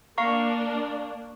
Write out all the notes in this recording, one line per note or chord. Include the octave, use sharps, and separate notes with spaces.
A#3 D4 F5 A#5 C#6